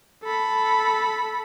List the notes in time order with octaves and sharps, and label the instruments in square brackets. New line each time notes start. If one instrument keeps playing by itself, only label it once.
[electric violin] A4 B5